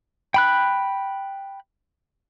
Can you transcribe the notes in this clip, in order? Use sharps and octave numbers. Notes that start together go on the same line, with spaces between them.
G5 B5 F#6